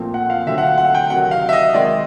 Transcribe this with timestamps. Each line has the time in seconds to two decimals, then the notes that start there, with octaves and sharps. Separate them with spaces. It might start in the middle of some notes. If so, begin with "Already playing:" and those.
Already playing: A#2 F3 A3 C4
0.14 F#5
0.30 F5
0.46 D3 F#3 A3 C4 E5
0.58 F#5
0.62 F5
0.78 F#5
0.95 G5
1.10 C3 D#3 F#3 F#5
1.31 F5
1.49 E5
1.53 D#5
1.74 D#3 G#3 C4 D5